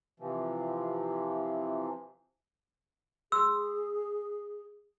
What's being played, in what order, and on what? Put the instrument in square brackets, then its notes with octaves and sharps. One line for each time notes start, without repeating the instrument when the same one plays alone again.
[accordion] C3 E3 F3
[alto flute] G#4 [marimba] C6 [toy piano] E6